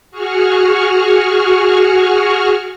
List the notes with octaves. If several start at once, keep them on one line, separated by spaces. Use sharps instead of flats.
F#4 G#4 C#6 F6